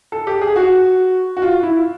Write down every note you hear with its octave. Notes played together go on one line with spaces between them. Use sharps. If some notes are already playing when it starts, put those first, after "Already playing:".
A4
G4
G#4
F#4
F#4
F4
E4